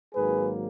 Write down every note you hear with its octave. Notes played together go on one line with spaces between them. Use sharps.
G#1 G#2 F#3 A#3 G#4 B4